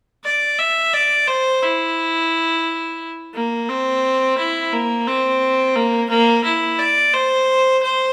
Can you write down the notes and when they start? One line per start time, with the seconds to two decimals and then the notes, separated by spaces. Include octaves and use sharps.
0.24 D5
0.58 E5
0.93 D5
1.27 C5
1.63 E4
3.34 A#3
3.69 C4
4.38 E4
4.73 A#3
5.07 C4
5.76 A#3
6.10 A#3
6.44 E4
6.79 D5
7.14 C5
7.83 C5